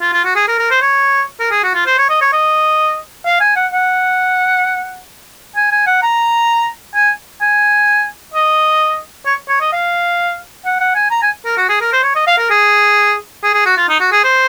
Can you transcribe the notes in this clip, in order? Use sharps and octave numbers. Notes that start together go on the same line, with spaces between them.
F4
F4
F#4
G#4
A#4
A#4
C5
C#5
A#4
G#4
F#4
F4
C5
C#5
D#5
C#5
D#5
F5
G#5
F#5
F#5
G#5
G#5
F#5
A#5
G#5
G#5
D#5
C#5
C#5
D#5
F5
F#5
F#5
G#5
A#5
G#5
A#4
F#4
G#4
A#4
C5
C#5
D#5
F5
A#4
G#4
G#4
G#4
F#4
F4
D#4
F#4
G#4
C5